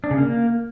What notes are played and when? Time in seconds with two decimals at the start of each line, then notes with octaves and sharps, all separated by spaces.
0.04 D4
0.11 C#3
0.18 A#3